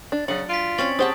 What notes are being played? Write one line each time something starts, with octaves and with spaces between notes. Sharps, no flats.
D4 A6
C#3 F#3 D4 F#5
F4 B6 D7
C4 C#4 C#5 C#6 A6 F#7
G4 G#4 C5 F#5 G5 A5 D#6